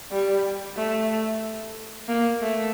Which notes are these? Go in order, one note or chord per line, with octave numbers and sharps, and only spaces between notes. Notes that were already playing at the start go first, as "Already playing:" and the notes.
G3
A3
A#3
A3